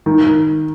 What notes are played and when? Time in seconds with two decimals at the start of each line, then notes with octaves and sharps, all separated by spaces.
0.06 D#3
0.25 D#3